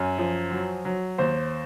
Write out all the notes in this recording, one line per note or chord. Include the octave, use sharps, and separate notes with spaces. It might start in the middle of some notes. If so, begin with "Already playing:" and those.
Already playing: F#2 G#5
F3
F#3
F#3
D#2 C5